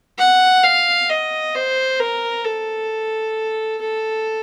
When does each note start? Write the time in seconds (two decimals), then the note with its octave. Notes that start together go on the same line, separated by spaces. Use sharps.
0.19 F#5
0.63 F5
1.10 D#5
1.55 C5
2.00 A#4
2.45 A4
3.82 A4